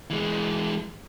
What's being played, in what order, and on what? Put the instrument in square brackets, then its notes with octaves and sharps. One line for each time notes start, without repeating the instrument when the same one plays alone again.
[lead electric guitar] E3 G#3